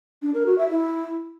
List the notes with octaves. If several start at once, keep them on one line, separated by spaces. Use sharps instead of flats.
D4
A#4
F#4
E5
E4